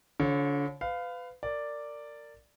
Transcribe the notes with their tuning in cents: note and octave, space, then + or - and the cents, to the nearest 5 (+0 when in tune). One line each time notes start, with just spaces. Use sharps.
D3 -40 F4 +15 C#5 -25
B4 +30 F5 +0
A#4 -25 D5 +0